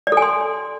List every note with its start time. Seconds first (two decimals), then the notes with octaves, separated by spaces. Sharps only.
0.07 D5
0.12 A4
0.17 G#5
0.22 C6